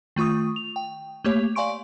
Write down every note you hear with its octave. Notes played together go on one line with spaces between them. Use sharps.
D#3 A3 F4 C#6 D#6
F7
G5
A3 A#3 G4 C#5
D5 F5 G#5 C6 C#6 D7